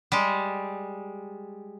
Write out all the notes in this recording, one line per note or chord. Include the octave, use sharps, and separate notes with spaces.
G3 G#3